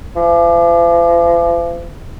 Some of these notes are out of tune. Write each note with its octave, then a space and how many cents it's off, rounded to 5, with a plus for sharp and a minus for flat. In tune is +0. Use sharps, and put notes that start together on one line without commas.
F3 -45